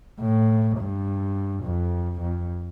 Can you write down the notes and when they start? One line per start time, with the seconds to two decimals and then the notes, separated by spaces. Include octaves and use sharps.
0.20 A2
0.78 G2
1.64 F2
2.21 F2